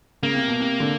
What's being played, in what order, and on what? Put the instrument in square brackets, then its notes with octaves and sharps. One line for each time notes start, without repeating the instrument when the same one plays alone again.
[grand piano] C#3 [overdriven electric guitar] A#3
[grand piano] C3
B2
C3
D3